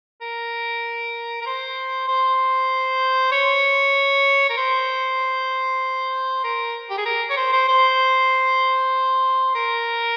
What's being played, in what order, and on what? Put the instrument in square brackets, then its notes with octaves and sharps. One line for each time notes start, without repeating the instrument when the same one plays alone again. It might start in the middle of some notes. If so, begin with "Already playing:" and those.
[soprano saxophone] A#4
A#4
C5
C5
C#5
A#4
C5
A#4
G4
G#4
A#4
C#5
C5
C5
C5
A#4